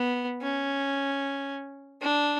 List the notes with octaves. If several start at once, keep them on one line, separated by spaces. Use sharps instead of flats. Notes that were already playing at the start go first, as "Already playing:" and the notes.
Already playing: B3
C#4
D4